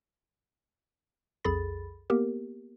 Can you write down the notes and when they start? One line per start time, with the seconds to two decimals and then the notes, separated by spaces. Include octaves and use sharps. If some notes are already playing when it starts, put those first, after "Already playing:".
1.45 B1 F2 G#4 A4 B5 A6
2.10 A#3 B3 G4 A#4